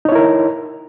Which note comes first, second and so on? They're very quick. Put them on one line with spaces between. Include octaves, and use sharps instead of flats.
D#4 C#5 E4 A#4